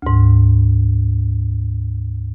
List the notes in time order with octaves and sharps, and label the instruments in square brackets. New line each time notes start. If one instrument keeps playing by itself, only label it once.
[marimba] D2 G#2